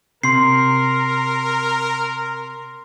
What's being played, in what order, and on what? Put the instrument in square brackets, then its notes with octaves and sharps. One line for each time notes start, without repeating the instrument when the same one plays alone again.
[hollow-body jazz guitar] C3 [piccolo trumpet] A#4 [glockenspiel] C6 C7